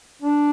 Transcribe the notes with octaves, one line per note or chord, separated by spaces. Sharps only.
D4